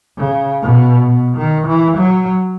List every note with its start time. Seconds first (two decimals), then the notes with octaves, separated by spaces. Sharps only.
0.18 C#3
0.62 B2
1.07 B2
1.37 D#3
1.67 E3
1.97 F#3